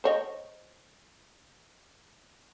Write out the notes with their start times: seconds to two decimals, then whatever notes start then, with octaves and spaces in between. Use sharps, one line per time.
0.04 C5 C#5 D#5